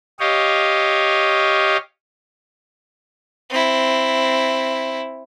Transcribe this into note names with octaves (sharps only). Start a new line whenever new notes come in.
G4 C#5 D#5 F5
C4 E4